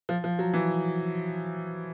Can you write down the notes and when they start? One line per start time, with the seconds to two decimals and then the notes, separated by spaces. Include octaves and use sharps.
0.09 F3
0.24 F3
0.39 F#3
0.54 E3